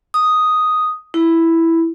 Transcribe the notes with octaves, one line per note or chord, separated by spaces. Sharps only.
D#6
E4